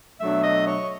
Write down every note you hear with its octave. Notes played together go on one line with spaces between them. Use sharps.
B2 F#3 A3 D4 E5
D#5
C#5